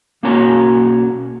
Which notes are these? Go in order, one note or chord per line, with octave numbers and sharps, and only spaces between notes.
B1 A#3 C#4 F#4 C#5 A#5